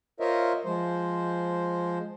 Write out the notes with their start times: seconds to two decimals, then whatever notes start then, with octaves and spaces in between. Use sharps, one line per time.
0.20 F4 A#4 C5 C#5 D#5 E5
0.65 F3 G#3 C5